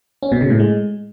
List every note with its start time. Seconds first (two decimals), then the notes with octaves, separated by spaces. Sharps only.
0.23 C#4
0.32 B2
0.41 C#3
0.50 A2
0.60 G#3